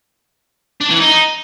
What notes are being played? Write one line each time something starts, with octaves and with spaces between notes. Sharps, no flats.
D4
E3
D#4